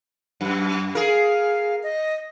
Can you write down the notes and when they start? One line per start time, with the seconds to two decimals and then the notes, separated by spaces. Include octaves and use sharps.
0.41 F#2
0.95 G#4 A#4 F5
1.83 D#5